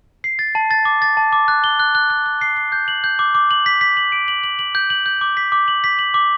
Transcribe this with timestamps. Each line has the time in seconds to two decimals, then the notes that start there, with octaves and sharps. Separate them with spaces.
0.24 C7
0.39 A6
0.55 A5
0.71 A6
0.85 D6
1.02 A6
1.17 A5
1.33 D6
1.48 F#6
1.64 G7
1.80 F#6
1.95 F#6
2.10 F#6
2.26 F#6
2.41 C7
2.57 C7
2.72 G6
2.88 F#7
3.04 G6
3.19 D6
3.35 D6
3.51 F#7
3.66 B6
3.81 B6
3.97 F#7
4.12 D7
4.28 F#7
4.44 F#7
4.59 F#7
4.75 G6
4.90 F#7
5.06 G6
5.21 D6
5.37 B6
5.52 D6
5.68 F#7
5.84 B6
5.99 F#7
6.14 D6